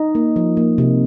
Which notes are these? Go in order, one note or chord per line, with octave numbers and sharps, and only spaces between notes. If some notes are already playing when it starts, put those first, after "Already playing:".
Already playing: D#4
A#3
F3
A#3
C3